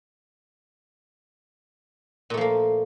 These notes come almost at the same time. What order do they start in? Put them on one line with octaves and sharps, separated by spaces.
A#2 A3 F3 A#3